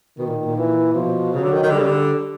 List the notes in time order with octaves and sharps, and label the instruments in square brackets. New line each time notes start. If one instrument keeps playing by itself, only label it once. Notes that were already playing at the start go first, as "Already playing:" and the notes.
[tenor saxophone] B2 [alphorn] D#3
[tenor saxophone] A#2
A#2
[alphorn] E3
[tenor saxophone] B2 [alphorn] F3
[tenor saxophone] C#3 [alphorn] F#3
[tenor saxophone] D3
D#3
D#3
[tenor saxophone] D3 [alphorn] G3
[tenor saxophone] C#3
D3